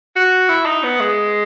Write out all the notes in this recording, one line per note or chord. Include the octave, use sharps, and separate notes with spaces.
F#4
E4
D#4
B3
G#3